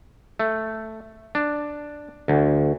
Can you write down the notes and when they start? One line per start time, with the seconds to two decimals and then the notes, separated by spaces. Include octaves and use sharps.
0.39 A3
1.35 D4
2.28 D2